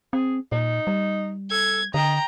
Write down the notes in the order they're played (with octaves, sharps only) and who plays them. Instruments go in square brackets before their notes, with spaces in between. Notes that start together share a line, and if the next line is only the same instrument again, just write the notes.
[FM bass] C4 [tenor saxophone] G#4
[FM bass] A#2 [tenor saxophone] D#4
[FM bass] G3
[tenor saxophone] A4 [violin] G#6
[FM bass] D3 [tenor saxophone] D#5 [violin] G5 A#5